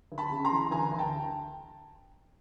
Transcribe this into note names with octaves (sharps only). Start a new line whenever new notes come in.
D2
A5 B5
C#3
A#5 C6
E3
D2 G#5 A#5
D2
G5 A5